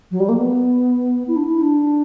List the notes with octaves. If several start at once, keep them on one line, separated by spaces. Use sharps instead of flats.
F#3
G3
A#3
B3
E4
D4
E4
D4